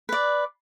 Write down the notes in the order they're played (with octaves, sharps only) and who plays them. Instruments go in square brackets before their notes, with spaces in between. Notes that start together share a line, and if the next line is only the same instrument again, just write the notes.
[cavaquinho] B4 D5